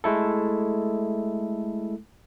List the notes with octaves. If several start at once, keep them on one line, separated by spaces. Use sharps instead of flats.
G#3 A3 E4 A4